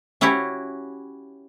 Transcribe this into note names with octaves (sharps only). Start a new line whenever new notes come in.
C#4 E4 F#4 G4 C#5